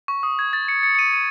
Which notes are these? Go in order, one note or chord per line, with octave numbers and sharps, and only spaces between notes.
C#6
D#6
G#6
A6
C#7
C#7
C#7
D#7
D#7